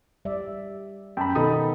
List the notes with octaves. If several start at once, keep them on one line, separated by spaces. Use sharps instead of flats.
G3 D5 E5
F#2 G5 A5 B5
B2 D#3 B3 D#4 A4 D#6